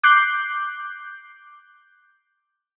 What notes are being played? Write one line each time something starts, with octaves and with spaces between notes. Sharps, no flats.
D6 F#6 G6 C7